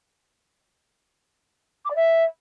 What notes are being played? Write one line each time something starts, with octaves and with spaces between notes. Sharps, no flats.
D6
D5
E5